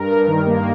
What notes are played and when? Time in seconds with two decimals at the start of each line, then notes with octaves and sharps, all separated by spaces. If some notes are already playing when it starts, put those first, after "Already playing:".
Already playing: G2 A#4
0.10 G2
0.28 D#3
0.46 A#3